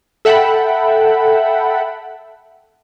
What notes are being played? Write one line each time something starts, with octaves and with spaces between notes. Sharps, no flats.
A4 E5 F#5 G5 A5 B5